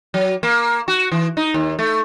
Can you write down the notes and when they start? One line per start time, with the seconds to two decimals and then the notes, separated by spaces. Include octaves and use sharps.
0.14 F#3
0.43 A#3
0.88 F#4
1.12 E3
1.37 D#4
1.54 D#2
1.79 A3